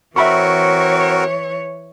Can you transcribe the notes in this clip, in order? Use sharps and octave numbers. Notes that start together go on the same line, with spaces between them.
E3 C4 F#4 A#4 C#5 E5 B5 C#6